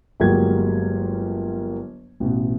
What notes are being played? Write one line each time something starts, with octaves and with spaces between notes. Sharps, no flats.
G1 F#3 G#3 A#3 G4 G#6
A1 B2